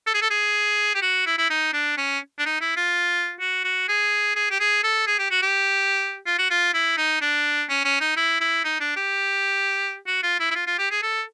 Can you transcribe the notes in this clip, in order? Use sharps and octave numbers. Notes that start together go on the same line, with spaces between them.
A4
G#4
A4
G#4
G4
F#4
E4
E4
D#4
D4
C#4
D4
D#4
E4
F4
F#4
F#4
G#4
G#4
G4
G#4
A4
G#4
G4
F#4
G4
F4
F#4
F4
E4
D#4
D4
C#4
C#4
D#4
E4
E4
D#4
D4
G4
F#4
F4
E4
E4
F4
F4
G4
G#4
A4